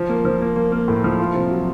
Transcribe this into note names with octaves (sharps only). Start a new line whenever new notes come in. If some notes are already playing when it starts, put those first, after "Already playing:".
Already playing: F3
A#3
F3
A#3
A#3
A#3
A2
F3
F4
C3
F#3